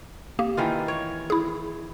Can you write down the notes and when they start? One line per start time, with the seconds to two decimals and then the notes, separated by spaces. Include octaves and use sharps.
0.39 A#3 G4
0.57 D#3 E3 F4
0.88 C#5
1.30 E4 G#4